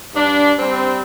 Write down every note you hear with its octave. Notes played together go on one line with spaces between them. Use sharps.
G2 D4
G3 C4